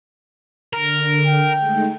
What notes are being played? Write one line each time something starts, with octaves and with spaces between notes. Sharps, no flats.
D3 A#4
G5
G#3 A3 D#4